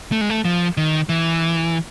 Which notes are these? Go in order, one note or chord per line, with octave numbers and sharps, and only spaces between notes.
A3
G#3
A3
F3
D#3
E3